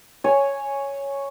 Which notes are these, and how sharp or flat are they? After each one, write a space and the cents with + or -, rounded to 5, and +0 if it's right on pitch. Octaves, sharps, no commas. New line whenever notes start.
C#5 +0 G#5 +0